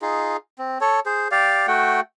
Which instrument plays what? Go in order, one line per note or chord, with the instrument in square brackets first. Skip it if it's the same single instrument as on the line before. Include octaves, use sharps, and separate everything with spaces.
[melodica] D#4 F4 G#4
C4
A4 C#5
G#4 C5
G4 D5 F5
A3 F#4 F#5 G5